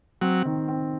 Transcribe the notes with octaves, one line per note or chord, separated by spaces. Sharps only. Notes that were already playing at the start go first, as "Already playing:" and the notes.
F#3 C4
D#3
C4